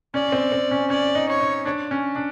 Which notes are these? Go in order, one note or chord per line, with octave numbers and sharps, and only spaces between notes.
C#4 D5
C4
C4
C#4
C#4 D5
D#4
C#5
D#4
D4
C#4
D4